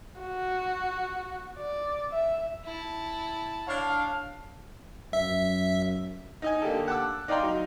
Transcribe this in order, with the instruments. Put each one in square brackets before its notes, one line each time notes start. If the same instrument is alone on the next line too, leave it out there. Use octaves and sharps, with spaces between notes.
[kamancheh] F#4
D5
E5
[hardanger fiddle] E4 A5
[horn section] D4 C#5 F5
[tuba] F#2 [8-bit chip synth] E5
[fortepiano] D#4 D#5 G#5
D3 A#3 G4 A4
F#5 A5 D6 E6
D#4 D5 F5 G5 A#5 C6
F#3 D#4